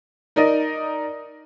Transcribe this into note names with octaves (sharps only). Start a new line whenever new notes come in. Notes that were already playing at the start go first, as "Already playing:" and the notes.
D#4 A#4 D5 D#5